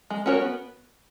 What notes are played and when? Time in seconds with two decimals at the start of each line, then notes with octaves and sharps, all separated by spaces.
0.10 G#3
0.26 C#4 F#4 A#4 C#5
0.41 B3